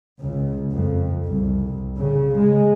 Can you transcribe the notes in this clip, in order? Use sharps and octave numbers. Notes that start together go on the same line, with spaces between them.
C#2
F2
C2
C#3
G#3